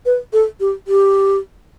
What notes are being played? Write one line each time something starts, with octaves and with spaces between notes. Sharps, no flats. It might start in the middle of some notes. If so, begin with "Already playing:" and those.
B4
A4
G4
G4